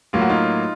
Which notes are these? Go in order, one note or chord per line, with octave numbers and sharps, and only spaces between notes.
A2 F#3 A#3 F4
F#4
D#4 F4